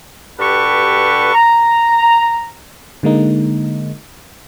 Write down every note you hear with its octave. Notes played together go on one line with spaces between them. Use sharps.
G2 F#4 G4 A4 B4 C#6
A#5
D3 G#3 A#3 D#4